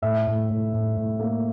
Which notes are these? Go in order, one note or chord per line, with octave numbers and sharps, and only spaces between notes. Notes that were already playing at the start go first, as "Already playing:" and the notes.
A2 E5
A2
A2
A2
A2
A#3